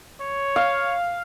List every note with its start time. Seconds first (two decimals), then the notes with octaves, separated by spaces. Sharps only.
0.21 C#5
0.56 F5